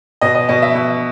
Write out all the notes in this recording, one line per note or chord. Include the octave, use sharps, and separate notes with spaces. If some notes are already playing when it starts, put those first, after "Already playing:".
B2 D#5
D#5
B2 D#5
E5
B2